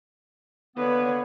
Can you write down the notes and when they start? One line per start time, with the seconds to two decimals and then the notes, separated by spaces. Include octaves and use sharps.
0.76 D3 A#3 B3 B4 C#5